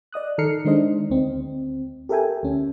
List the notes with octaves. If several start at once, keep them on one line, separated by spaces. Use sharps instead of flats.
D5 D#5 D#6 F#6
D#3 A4 A#5 F6 C7 C#7
D#3 G#3 D4 C5 D#5
D2 C4
G4 A4 A#4 E5 G5 G#5
D2 C#4